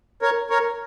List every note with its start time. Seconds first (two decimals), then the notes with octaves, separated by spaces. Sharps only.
0.22 A#4 C#5
0.50 A#4 C#5